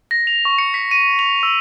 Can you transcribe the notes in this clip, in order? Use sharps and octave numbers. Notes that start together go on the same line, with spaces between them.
A#6
F7
C#6
C#7
B6
D#7
F7
E6